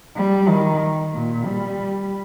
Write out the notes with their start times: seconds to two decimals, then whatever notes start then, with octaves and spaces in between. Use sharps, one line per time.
0.16 G3
0.49 D#3
1.14 A#2
1.45 G3